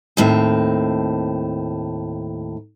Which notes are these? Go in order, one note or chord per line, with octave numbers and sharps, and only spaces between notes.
D#2 A2 C4